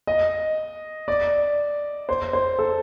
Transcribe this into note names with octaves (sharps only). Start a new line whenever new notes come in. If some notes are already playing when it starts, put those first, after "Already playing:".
D#5
D5
C5
C5
A4